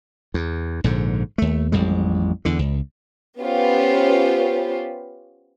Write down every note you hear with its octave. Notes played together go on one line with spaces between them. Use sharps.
E2
A#1 G#2 D3
D#2 A3
A1 F2 G3 G#3
E2 D3
C#2
B3 C#4 F4 G4 B4 C5